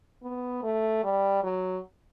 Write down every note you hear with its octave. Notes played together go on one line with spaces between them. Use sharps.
B3
A3
G3
F#3